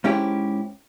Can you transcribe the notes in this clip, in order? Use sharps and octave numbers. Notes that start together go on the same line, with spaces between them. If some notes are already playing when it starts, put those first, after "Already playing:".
G#2 C#4 E4 G4